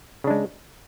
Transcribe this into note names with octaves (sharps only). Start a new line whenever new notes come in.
C#3 G#3 D4